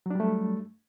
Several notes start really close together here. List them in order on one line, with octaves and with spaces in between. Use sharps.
F#3 D4 G3 A3